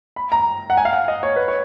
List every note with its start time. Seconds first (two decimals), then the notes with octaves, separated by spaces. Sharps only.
0.16 B5
0.32 A#5
0.70 F#5
0.77 G#5
0.85 F5
0.93 F#5
1.08 D#5
1.23 C#5
1.36 B4
1.48 C#5